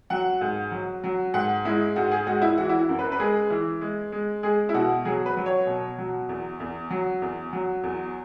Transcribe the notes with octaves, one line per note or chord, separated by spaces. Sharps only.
F#3 F#5
G#2
F#3
F#3
G#2 F#5
G#3 E4
G#2 F#4
G#4
G#3 F#4
E4
E3 F#4
E4
F#4
F#2
B4
B4
G#3 G#4
E3
G#3
G#3
G#3 G#4
E4
B2 F#4
F#3 G#4
B4
F#3
C#5
B2
F#3
E2
E2
F#3
E2
F#3
E2